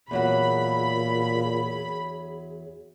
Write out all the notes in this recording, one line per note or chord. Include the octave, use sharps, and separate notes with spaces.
E2 A#2 F#3 G#4 F#5 B5